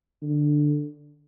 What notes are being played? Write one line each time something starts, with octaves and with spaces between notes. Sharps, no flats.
D3